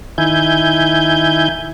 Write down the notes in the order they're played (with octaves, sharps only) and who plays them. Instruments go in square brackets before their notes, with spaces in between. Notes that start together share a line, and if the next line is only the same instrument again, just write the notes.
[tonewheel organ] D#3 E4 G#5 G6